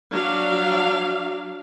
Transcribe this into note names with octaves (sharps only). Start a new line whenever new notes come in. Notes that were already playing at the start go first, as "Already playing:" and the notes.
F#3 D4 F5